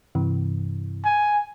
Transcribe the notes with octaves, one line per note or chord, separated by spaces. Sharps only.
G2 C3 E3
G#5